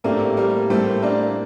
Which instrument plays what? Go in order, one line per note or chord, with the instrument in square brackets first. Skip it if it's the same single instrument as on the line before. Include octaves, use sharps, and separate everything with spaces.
[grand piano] A2 A3 C4 G4 [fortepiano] A#3 D4
[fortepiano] G3 A#3
[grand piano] A2 G3 A#3 [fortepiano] A3 C4
[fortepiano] A#3 D4